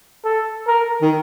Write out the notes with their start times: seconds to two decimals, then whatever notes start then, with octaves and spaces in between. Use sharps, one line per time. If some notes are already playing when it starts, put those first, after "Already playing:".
0.25 A4
0.68 A#4
1.02 D#3